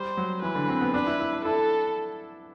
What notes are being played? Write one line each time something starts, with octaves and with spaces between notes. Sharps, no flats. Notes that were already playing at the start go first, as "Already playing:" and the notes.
Already playing: G3 C5
F#3
E3 B4
D3
C4
B3
D4 B4
E4
E4
D4
E4 A4